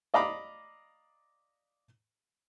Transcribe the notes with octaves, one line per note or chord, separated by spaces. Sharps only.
D5 D#5 F5 A#5 B5 D6